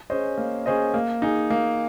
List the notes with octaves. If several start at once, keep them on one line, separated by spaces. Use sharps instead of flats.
C#4 G#4 C5 D#5
A#3
C#4 G#4 C5 D#5
A#3
D#4 G#4
A#3